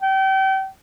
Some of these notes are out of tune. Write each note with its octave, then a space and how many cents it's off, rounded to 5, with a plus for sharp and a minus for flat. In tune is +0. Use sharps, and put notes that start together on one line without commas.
G5 -35